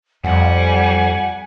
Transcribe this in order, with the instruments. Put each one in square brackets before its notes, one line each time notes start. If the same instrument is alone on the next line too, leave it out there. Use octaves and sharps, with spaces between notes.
[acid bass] F2 [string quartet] G3 [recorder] F#5 [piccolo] G#5